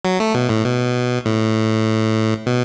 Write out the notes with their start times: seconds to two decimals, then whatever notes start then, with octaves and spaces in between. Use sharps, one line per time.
0.05 F#3
0.20 A3
0.35 B2
0.49 A2
0.65 B2
1.26 A2
2.46 B2